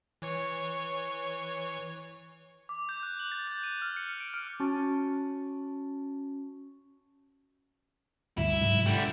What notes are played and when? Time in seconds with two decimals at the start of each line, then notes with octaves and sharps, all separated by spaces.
0.22 E3 C#5 C#6
2.69 D6
2.89 G6
3.03 F#6
3.19 F#7
3.32 A6
3.47 G6
3.64 D#7
3.82 F6
3.97 C#7
4.08 C#7
4.20 D7
4.34 F6
4.60 C#4 F#4 A5 C#6 A6
8.38 D2 G2 E4
8.61 G#2 C3 F#3
8.86 D3 G3